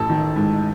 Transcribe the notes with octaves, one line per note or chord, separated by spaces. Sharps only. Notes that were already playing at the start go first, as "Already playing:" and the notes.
Already playing: A1 A4
D#3
G#2